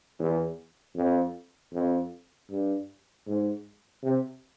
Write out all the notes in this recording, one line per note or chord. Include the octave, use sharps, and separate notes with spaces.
E2
F2
F2
G2
G#2
C3